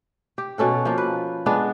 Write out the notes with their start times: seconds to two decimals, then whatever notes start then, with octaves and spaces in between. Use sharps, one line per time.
0.38 G4
0.58 B2 C#4 A4 F#5
0.85 F3 A#3
0.98 B4
1.46 G#3 B3 D4